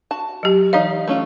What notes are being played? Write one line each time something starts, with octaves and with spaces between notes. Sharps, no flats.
F#4 A5
F#3 G4
E3 D#4 C#5 D#5 F5
A3 C#4 F4